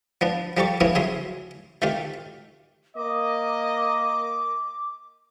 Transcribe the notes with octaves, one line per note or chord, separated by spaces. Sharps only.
F3 B3 D4
F3 G3 G4 A4 C#6 D6
E3 F3 A3 B3 C#4 E4
C#3 F#3 G#4 E5 C6 D#6
C3 D#3 A3 F4 G4
A#3 D#5 D6